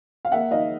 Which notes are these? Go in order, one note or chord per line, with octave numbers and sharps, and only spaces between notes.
F5
A#3 E5 F#5
D#4 D#5 F5